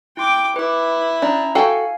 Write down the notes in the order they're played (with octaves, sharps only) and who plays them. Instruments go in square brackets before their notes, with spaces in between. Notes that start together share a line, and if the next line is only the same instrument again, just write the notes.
[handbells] E4 C6 [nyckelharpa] G5 D6
[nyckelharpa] E4 [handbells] B4 D6
[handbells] C#4 A#5 [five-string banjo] D4
[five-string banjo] F#4 A4 G5 [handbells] F5 G#5 C7